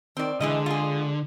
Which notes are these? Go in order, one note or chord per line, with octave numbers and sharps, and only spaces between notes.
D#3 C4 D5
D3 E3 G#3 E4 D#5
F4 G#4